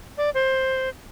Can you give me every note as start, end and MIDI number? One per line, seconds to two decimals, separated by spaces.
0.18 0.30 74
0.34 0.89 72